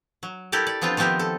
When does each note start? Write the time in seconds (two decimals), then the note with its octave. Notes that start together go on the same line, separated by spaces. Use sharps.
0.23 F#3
0.52 E4 G4 A4 A#4 D5
0.67 D5
0.81 F3 B3 C4 D4 F4
0.97 D#3 F3 B3 C4 G4 A#4
1.19 A4